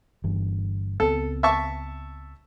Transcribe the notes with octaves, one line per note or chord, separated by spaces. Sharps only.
G1 G2 E3
C#2 B3 C4 A4
E5 A5 C#6